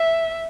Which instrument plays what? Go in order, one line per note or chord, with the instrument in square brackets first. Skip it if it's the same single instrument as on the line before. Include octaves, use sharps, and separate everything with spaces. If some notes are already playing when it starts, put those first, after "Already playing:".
Already playing: [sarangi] E5